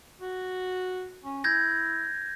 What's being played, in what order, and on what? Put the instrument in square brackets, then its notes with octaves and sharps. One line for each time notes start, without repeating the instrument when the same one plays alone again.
[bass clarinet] F#4
C#4
[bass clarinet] E4 [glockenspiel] G6 G#6 A#6